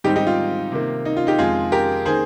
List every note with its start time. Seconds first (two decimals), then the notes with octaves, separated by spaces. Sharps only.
0.04 G#2 D#3 G3 C4 D#4 G4
0.16 D#4 G4
0.27 F4
0.72 C3 D#3 A#3
1.05 D#4
1.17 F4
1.27 D#4 G4
1.38 F2 D#3 G#3 F4 G#4
1.72 G4 A#4
2.05 D#3 A#3 G#4 C5